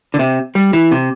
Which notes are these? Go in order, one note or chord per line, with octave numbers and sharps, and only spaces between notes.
D3
C3
G3
E3
C3